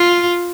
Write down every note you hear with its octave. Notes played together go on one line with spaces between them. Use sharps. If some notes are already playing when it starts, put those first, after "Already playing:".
Already playing: F4